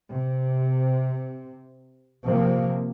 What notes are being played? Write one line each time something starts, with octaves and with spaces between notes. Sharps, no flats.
C3
C3 F3 A#3